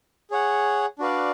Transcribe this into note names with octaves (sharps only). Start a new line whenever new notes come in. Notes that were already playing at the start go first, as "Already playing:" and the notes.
G#4 C#5 F#5
D4 F#4 B4 D5 F5